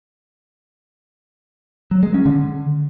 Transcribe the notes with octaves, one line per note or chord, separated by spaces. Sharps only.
F#3
G#3
C#4
D3